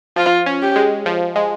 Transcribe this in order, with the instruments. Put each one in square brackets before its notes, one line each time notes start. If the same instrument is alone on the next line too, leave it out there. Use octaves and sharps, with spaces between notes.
[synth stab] F3 [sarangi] F4
[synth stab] C#4
[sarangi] G4
[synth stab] G#3
F3
G#3